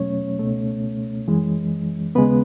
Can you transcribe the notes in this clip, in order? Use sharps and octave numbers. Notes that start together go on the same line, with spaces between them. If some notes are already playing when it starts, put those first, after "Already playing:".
Already playing: E2 B2 F#3 A3 C#4 C#5
C#2 B2 A3
F#2 E3 G#3
D#2 C#3 G#3 B3 B4